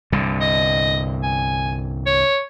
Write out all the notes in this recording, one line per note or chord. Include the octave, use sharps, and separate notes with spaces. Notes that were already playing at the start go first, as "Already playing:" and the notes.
C2 G2 D3
D#5
G#5
C#5